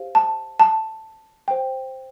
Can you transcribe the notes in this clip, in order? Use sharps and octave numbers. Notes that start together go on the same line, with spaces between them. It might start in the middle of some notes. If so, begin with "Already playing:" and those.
Already playing: G4 C5 F5
A5
A5
C5 G5